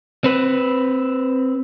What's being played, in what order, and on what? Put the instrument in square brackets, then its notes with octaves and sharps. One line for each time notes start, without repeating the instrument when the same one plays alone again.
[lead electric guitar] C4 B4